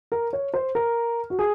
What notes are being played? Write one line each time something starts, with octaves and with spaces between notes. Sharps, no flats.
A#4
C#5
C5
A#4
F#4
G#4